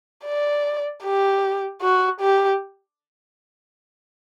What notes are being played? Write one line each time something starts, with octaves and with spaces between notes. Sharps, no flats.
D5
G4
F#4
G4